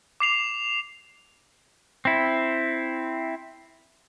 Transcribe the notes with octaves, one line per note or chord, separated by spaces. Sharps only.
D6 C7 F7
C4 E4